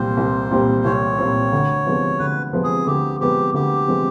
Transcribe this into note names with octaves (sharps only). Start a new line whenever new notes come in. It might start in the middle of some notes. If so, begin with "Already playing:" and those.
Already playing: C2 A#2 G3 C4 C5
C2
A#2 G3 C4
C2 C#5
A#2 G3 C4
D2
C3 F3 G#3 B3
D2 B4
C3 F3 G#3 B3
G#4
D2 G4
C3 F3 G#3 B3 G4
D2 G4
C3 F3 G#3 B3